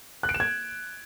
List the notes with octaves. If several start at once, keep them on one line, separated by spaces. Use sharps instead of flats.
F#6
D7
E7
G#6